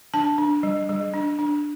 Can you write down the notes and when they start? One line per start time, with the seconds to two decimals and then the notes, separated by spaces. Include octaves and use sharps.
0.14 D4 A5
0.38 D4
0.63 G3
0.89 G3
1.14 D4
1.39 D4